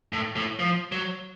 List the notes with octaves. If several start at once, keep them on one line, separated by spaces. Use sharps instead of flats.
A2
A2
F3
F#3